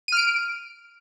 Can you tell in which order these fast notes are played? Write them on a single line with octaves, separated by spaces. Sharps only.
D#7 F6 D7